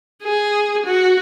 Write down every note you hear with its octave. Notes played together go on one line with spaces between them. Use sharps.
G#4
F#4